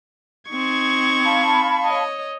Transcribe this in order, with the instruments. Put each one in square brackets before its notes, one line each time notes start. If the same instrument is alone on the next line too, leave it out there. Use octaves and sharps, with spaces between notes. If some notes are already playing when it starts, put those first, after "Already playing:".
[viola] C4 D#4 [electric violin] C#6 G#6
[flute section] F5 A5 B5
[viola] C#5 D#5